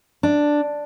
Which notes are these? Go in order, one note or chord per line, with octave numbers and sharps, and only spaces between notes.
D4